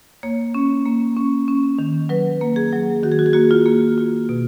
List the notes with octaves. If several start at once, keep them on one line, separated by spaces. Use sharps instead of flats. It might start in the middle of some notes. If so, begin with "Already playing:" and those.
A#3 C#5
C#4
A#3
C#4
C#4
D#3
F#3 B4
A#3
G#4
F#3
D#3 F#4
G#4
F#4
G#4
A#3 F#4
F4
A#3
F4
B2